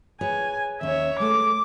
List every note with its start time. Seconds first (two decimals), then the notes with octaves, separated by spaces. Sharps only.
0.21 G#4 B4 C#5 G#5
0.81 D#2 C#4 C#5 E5
1.20 G#3 A3 B4 D6